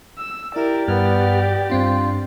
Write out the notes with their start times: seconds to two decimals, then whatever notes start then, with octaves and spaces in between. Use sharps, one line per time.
0.19 E6
0.56 E4 G4 A#4 D5
0.88 G2 B3 F6
1.70 G2 C4 D4 F4